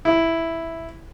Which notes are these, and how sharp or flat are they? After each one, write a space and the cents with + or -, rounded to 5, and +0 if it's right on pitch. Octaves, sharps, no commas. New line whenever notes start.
E4 +0